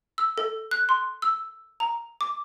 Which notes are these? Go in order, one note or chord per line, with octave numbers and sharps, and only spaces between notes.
E6
A4
F#6
C6
E6
A#5
D6